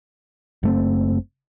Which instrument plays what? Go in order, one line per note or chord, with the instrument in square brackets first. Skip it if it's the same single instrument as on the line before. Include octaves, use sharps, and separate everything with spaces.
[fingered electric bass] F#1 A3 C4